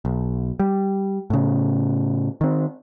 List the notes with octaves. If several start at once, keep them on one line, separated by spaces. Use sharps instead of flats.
B1
G3
A2 C#3
D#3 C4